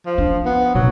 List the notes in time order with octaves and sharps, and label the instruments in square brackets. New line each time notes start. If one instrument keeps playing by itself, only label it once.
[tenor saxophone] F3
[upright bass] D4
[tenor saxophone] B3
[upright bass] B1 A#2 [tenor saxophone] F#3